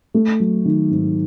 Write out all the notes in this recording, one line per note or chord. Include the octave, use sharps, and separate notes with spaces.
A3
F#3
D#3
G#2